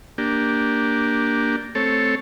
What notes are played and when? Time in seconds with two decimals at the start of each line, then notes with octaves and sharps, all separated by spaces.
0.18 A#3 D4 G4
1.75 A3 C4 A4 C#5